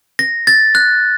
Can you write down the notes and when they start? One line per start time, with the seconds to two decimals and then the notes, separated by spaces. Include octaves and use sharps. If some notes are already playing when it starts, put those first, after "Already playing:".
0.19 A#6
0.47 A6
0.75 F#6